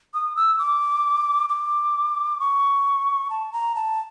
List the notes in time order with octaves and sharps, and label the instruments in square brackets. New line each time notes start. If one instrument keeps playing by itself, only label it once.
[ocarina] D#6
E6
D6
D6
C#6
A5
A#5
A5